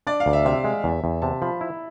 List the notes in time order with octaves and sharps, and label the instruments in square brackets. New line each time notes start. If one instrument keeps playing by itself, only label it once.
[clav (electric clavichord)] D4 [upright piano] D5
[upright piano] F5
[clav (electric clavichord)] D2
[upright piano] E5
[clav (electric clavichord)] C3 [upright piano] E5
[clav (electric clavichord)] G#3
E2
E2
[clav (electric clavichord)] C3 [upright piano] A5
[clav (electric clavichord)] F3 [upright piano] B5
[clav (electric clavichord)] E4